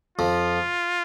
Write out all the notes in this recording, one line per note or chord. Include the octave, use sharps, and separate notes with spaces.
F2 F3 F4